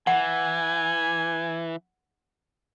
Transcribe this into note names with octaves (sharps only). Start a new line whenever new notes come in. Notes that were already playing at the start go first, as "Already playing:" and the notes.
E3 F#5 G#5